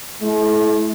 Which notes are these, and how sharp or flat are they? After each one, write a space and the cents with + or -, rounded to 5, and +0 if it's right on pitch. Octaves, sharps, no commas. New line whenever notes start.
A3 -45 E4 -5